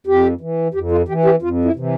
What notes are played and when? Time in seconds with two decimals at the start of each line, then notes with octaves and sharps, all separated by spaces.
0.07 F2 G4
0.41 E3
0.74 F2 G4
0.91 F4
1.08 E3 G4
1.25 G4
1.42 F2 F4
1.65 E4
1.76 C3 E3